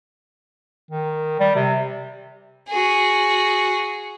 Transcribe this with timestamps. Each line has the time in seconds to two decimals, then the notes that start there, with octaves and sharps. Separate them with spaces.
0.91 D#3
1.40 G3
1.56 C3
2.69 F#4 G#4